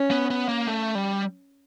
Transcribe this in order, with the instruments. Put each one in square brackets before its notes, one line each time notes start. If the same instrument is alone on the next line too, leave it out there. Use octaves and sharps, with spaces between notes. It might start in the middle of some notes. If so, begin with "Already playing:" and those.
Already playing: [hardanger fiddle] C#4
[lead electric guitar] B3
B3
A#3
A3
G3